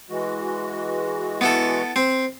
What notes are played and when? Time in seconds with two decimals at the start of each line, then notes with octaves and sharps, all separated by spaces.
0.10 E3 G#3 F#4
1.41 B3 E4 A4
1.96 C4